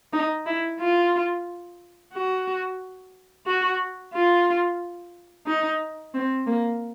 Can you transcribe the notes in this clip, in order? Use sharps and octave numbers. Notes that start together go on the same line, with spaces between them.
D#4
E4
F4
F#4
F#4
F4
D#4
C4
A#3